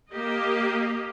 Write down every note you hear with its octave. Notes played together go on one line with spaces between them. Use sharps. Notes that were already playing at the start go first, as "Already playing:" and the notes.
A#3 G4 D#5